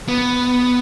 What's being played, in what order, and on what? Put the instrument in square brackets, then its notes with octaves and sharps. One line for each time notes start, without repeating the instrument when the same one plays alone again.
[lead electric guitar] B3